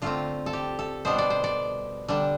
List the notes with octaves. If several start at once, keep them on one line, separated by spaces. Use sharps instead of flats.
D3 A3 C4 F4
A4
G4
A4
B2 G3 B3 D4 C5
D5
C5
D5
D3 G3 D4